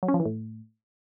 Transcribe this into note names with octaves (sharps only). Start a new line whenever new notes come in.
F#3
C#4
F3
E3
A2